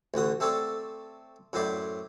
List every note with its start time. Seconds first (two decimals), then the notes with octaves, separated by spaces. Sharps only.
0.14 A1 D2 F#4 D#6
0.40 A3 C4 A4 C#5 D5
1.53 F#2 A2 F#3 C5 D5 B5